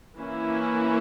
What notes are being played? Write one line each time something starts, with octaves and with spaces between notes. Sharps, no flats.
E3 A#3 C#4 E4